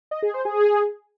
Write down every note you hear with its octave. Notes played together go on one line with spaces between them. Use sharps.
D#5
G#4
C5
G#4